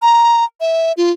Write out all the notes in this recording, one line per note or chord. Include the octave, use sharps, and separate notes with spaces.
A#5
E5
F4